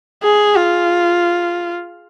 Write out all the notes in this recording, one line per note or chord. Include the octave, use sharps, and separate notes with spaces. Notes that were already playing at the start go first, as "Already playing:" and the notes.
G#4
F4